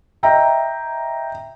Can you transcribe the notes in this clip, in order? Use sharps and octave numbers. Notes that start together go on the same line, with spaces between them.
D#5 E5 G5 A#5